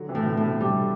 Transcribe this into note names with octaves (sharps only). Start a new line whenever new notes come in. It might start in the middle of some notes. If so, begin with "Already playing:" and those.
Already playing: D3 F#3
C3 E3
A2
B2 D3
A2
C3
B2 D3 G3